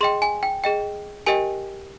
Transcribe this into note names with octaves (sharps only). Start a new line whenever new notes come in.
G#4 D#5 G5 C6
G#5
G5
G#4 D#5 G5
G4 A#4 D#5 G5 G#5